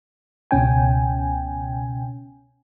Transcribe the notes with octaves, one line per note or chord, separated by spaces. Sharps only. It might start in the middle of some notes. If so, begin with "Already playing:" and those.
C#2 B2 C#4 G5 G#5